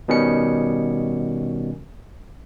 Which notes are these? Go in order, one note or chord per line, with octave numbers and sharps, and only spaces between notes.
B2 D#3 G3 C#4 C#7